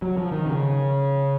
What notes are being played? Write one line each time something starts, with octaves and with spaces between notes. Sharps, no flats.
F#3
F3
D#3
C#3